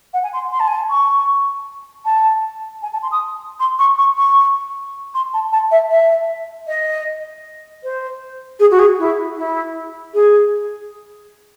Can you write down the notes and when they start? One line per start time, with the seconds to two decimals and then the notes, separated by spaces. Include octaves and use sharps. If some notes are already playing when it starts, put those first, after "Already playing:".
0.13 F#5
0.23 G#5
0.33 C6
0.51 C6
0.59 A5
0.67 G#5
0.75 A5
0.90 C#6
2.05 A5
2.82 G#5
2.92 A5
3.02 C6
3.11 D#6
3.59 C6
3.79 C#6
3.98 C#6
4.17 C#6
5.14 C6
5.33 A5
5.52 A5
5.71 E5
5.90 E5
6.67 D#5
7.83 C5
8.59 G#4
8.71 F#4
8.79 G#4
8.98 E4
9.37 E4
10.14 G#4